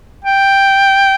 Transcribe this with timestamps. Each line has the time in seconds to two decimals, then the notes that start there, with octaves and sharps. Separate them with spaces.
0.24 G5